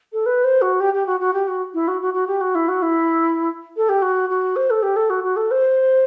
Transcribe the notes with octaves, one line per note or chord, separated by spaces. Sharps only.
A4
B4
C5
F#4
G4
G4
F#4
F#4
G4
F#4
E4
F#4
F#4
F#4
G4
F#4
E4
F#4
E4
A4
G4
F#4
F#4
C5
A4
G4
A4
F#4
F#4
A4
C5